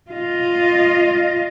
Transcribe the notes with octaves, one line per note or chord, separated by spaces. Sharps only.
F4 D#5